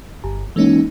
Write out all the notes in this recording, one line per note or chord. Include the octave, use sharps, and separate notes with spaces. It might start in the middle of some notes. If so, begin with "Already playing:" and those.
G1
E3 G#3 A#3 C#4 D#4